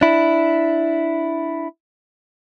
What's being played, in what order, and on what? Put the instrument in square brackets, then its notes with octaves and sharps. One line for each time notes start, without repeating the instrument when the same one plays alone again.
[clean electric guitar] D4 E4